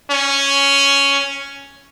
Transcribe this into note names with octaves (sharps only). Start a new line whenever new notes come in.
C#4